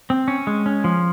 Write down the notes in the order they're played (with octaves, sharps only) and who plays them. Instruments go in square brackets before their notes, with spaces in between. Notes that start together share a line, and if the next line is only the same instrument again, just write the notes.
[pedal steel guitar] C4
C#4
G#3
C#4
F3